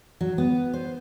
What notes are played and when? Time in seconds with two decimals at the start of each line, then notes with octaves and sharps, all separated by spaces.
0.21 F#3
0.38 B3
0.74 C5